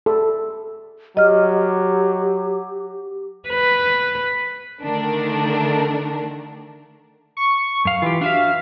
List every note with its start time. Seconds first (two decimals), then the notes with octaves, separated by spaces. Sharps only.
0.06 A4
1.17 F#3 G4 D#5 F6
3.49 B4
4.81 D3 D#3 A3 D4 A#4
7.37 C#6
7.85 F#2 F5
8.02 E3 F4 G4
8.21 D4 F#4 E5 F5